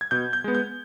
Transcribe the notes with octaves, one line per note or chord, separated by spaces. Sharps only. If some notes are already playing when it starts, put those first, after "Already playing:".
G#6
B2 G6
G6
G#3 B3
G6